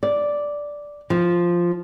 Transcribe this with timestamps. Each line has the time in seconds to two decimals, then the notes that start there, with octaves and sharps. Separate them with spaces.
0.03 D5
1.10 F3